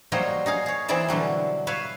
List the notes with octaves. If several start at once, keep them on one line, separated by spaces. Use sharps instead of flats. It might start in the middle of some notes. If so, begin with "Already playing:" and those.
F#3 G3 A#3 D#4 C5 C#5
D#4 G#4 F5
G#4 C#5
E3 C4 E4 G#4 D5 E5
B2 D3 F#3 G3
B4 C#5 E5 F5